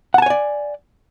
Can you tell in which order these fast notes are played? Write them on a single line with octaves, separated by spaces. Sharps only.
F#5 A5 G#5 C#5 D5